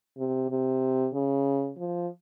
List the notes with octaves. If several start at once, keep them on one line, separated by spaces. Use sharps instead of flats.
C3
C3
C#3
F3